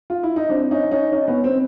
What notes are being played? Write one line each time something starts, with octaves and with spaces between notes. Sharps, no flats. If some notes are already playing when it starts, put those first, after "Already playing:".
F4
E4
D#4
C4 D4
C#4 D#4
C#4 D#4
C#4 D#4
B3 C#4
C4